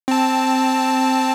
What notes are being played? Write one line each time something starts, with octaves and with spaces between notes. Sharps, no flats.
C4 A5